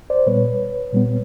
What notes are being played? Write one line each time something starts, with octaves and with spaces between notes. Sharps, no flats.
C5 D5
A#2 G3 B3 B4 C#5
A#2 G3 B3